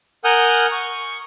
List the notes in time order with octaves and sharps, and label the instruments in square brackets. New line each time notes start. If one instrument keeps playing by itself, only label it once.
[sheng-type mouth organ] A#4 F#5 G#5 D#6 F6 G6
C#6